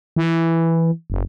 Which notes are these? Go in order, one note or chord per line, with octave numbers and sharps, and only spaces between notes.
E3
F#1